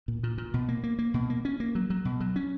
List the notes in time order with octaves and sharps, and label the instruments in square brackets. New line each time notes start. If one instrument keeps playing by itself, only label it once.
[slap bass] A#2
A#2
A#2
B2
A#3
A#3
A#3
B2
A#3
C#4
A#3
F#3
F#3
B2
F#3
C#4